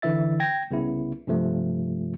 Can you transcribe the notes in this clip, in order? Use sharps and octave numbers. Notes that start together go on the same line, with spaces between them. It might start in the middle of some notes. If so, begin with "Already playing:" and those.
D3 E3 E4 E5 A6
G5 G#6 A#6
C2 C#3 B3 E4
G2 C3 F3 A3